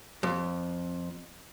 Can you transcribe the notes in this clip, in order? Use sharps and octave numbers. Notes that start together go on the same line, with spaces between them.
F2